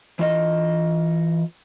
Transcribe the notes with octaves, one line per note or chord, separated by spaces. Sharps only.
E3 F4 D#5